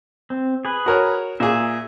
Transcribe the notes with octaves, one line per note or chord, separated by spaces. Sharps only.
C4
G#4 B4
F#4 A#4 C#5
A#2 G#4 E5